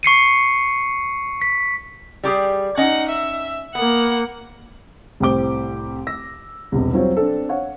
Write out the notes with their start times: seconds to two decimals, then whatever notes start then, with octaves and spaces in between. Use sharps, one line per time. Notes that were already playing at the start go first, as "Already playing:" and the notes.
0.03 C#6 C7 C#7 D#7
1.42 B6
2.24 G3 G4 G#4
2.77 C#4 D#4 D#5 F#5
3.09 E5
3.75 A#3 B3 F#5
5.20 C2 A2 G4 C5 D6 G7
6.07 E6 A#6
6.72 E1 C2
6.93 F#3 G3 C4 F4 C5 C#5
7.17 C4 D4 A4
7.49 C#5 F5 F#5